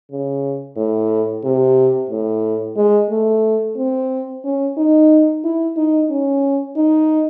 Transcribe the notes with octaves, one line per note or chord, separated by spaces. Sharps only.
C#3
A2
C3
A2
G#3
A3
C4
C#4
D#4
E4
D#4
C#4
D#4